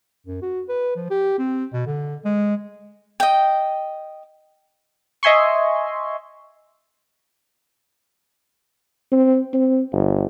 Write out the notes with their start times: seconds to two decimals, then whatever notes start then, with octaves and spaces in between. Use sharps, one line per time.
0.27 F#2
0.42 F#4
0.69 B4
0.96 F3
1.10 G4
1.39 C4
1.73 B2
1.86 D3
2.25 G#3
3.20 D#5 G5
5.23 D#5 E5 G#5 C6 C#6
9.12 C4
9.54 C4
9.92 G1